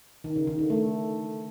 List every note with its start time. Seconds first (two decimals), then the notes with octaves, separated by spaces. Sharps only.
0.24 D#3
0.36 C#3
0.47 D#3
0.59 D3
0.70 A3